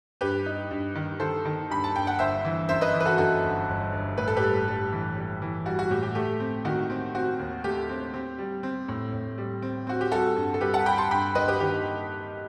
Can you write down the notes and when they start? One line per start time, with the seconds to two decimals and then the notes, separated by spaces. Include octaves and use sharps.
0.21 G2 G4 B4
0.46 D#4
0.71 G2
0.95 D#3
1.20 D#3 A4 C5
1.45 D#3
1.70 G2 B5
1.84 A5
1.95 G2 G5
2.07 F#5
2.19 G1 C5 E5
2.45 E3
2.69 F#2 C5 E5
2.81 B4 D#5
2.94 E3
3.00 B4
3.05 F#4 A4
3.18 F#2 F#4 A4
3.44 G1
3.68 G1
3.92 G1
4.17 A2 B4
4.28 A4
4.36 G4 B4
4.42 G3
4.68 G3
4.92 E3
5.17 G3
5.42 E3
5.66 G3 F#4
5.79 F#4
5.90 A2 G4
6.03 G4
6.15 A3 G4
6.40 C4
6.65 D#3 F#4
6.90 C4
7.15 C4 F#4
7.39 D#2
7.64 A3 G4
7.89 C4
8.14 C4
8.38 G3
8.63 C4
8.88 A2
9.13 A2
9.38 G3
9.62 C4
9.87 C4 F#4
10.01 G4
10.11 G3 F#4 A4
10.36 G2
10.54 A4
10.61 G3 G4 B4
10.74 F#5 A5
10.85 G3 G5 B5
10.98 A5 C6
11.11 G2 G5 B5
11.35 G2 B4 D#5
11.48 G4 B4
11.60 D#3 G4